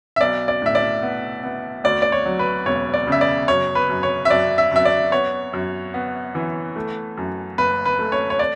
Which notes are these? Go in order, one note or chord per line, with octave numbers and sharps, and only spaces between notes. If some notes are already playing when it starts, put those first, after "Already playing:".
E5
B1 D5
D5
A2 E5
D5
B3
B3
D2 D5
D5
C#5
F#3
B4
E1 C#5
D5
C#3 E5
D5
F#2 C#5
B4
F#2
C#5
E5
F#2 D5
E5
F#2 E5
D5
B3 C#5
F#2
B3
E3
A3
F#2
F#1 B4
B4
A3
C#5
C#5
D5